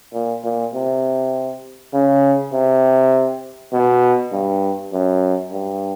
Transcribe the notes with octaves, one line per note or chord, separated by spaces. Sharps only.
A#2
A#2
C3
C#3
C3
B2
G2
F#2
G2